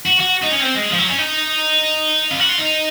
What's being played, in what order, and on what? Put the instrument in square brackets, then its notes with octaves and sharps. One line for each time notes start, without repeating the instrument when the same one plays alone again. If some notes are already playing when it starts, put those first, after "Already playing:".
[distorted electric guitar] F#4
F#4
D#4
C#4
C4
G#3
F3
F#3
C#4
D#4
F4
F#4
F4
D#4